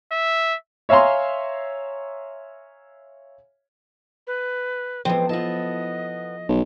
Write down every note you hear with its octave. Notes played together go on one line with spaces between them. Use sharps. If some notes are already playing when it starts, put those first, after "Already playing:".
E5
C#5 E5 F5 G#5 A#5 C6
B4
E3 F3 G#3 B3 C4 A4
B3 E4 F4 C5 D#5 A5
B1